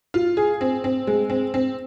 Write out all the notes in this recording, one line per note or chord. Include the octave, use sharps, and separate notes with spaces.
F4
G#4
C4
C4
G#3
C4
C4